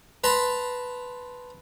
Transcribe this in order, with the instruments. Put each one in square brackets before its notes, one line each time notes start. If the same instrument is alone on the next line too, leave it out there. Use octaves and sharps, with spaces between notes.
[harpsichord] B4 A5 A#5 C6